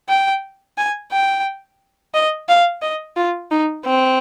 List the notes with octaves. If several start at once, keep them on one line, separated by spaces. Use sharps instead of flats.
G5
G#5
G5
D#5
F5
D#5
F4
D#4
C4